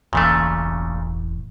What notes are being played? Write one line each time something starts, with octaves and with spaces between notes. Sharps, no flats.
E1 A1 A#2 C#3 E3 A3